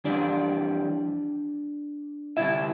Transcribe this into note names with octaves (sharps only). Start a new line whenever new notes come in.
F2 E3 G3 D4 D5
D2 C3 G3 E4 E5